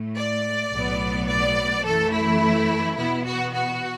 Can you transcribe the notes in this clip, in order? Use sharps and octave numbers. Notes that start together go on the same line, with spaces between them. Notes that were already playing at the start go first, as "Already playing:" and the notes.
Already playing: A2 A3
D5
B1 A2 F#3 B3
D5
F#2 E3 A3 A4
E4
E2 B2 B3 E4
F#4
F#4